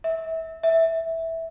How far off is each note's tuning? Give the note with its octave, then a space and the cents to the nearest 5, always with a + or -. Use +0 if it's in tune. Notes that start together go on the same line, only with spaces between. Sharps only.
E5 -20
E5 -10